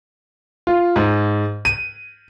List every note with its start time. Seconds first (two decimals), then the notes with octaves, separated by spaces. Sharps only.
0.67 F4
0.96 G#2
1.65 D#7